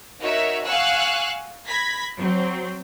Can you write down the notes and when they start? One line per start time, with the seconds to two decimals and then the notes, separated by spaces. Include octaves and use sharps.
0.20 D#4 F#4 A#4 C#5 E5
0.65 F5 F#5 G#5 C#6 E6 F#6
1.68 B5 G#6 A#6 B6
2.18 F#3 C4